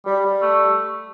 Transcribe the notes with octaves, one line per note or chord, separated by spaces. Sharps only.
G3
G3
A3